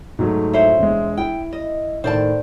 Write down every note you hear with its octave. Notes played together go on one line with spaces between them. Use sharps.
G#2 F#3 A3
E4 C5 C#5
E1 G#3
E4 G5
D#5
A2 D#3 C5 D5 A5